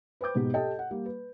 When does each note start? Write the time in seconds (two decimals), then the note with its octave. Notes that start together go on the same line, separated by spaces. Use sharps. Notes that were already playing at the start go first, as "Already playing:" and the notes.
0.21 B4 C5 G5 D6 G6
0.35 G#2 B2 B3 G4
0.54 G4 A4 D#5 G5 A5
0.79 F#5
0.91 G3 A#3
1.06 B4